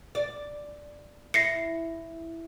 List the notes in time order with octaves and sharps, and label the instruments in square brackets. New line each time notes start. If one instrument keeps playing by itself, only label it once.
[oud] D5
[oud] E4 [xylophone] A#6 C7 C#7